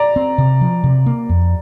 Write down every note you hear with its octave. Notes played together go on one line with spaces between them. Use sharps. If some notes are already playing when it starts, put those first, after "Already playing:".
Already playing: D5 A#5
C4
C3
F3
C3
A#3
F2